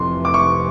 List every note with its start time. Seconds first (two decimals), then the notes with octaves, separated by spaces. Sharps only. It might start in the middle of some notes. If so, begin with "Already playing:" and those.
Already playing: F1 F2 C3 E3 C6
0.25 D6
0.34 C#6